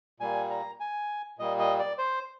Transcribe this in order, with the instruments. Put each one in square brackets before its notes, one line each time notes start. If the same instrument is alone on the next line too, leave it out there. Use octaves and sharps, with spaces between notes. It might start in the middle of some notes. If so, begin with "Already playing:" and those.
[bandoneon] A#2 G3 A#3 G#5
A#5
G#5
A#2 G3 A#3 D#5
D#5
D5
C5